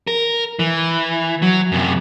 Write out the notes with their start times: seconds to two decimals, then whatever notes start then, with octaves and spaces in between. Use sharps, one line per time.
0.07 A#4
0.59 E3
1.42 F#3
1.72 F#2 C3